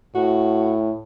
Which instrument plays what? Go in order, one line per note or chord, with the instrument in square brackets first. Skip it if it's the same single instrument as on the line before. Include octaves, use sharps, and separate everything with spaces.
[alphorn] A2 [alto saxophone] F#4